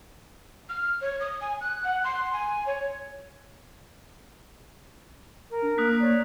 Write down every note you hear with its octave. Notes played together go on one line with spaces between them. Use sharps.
F6
C#5
D#6
G#5
F#6
F#5
C6
G#5
C#5
A#4
D4
A#3 D#6 F#6 B6
C#5 D5